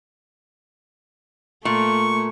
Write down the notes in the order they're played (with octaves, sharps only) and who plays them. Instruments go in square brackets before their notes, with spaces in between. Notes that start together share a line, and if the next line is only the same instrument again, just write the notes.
[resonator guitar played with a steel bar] A#2 [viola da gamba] A3 [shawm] C#6